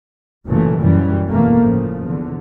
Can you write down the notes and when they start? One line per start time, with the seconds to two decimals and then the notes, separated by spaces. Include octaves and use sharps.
0.48 F#1 F#2 A#2 C#3 E3 A3
0.80 F#2 E3 G3
1.28 G1 E2 B2 E3 A3 A#3
1.61 A2 C#3 F3
2.06 E2 D3